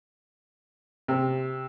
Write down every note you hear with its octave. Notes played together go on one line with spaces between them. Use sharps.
C3